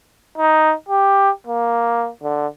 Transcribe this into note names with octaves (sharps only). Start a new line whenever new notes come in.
D#4
G4
A#3
D3